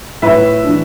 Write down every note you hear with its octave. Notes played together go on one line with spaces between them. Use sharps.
A2 B4 E5
E3 D4